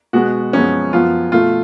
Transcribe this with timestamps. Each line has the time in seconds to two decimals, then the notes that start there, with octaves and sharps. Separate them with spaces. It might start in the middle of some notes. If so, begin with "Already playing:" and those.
0.13 B2 G#3 B3 F#4
0.53 F#2 F3 G#3 B3 C#4
0.93 F#2 F3 B3 F4
1.32 B2 A3 F4